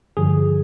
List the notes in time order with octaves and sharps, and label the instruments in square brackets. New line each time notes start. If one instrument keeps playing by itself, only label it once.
[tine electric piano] G2 D3 F3 G#4